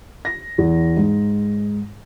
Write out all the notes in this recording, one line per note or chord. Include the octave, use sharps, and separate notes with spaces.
A#6
E2
G#2